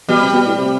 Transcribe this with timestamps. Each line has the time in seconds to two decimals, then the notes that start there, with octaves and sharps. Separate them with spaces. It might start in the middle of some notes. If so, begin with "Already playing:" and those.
0.09 B2 G3
0.21 C3
0.33 B2
0.46 A2
0.58 C3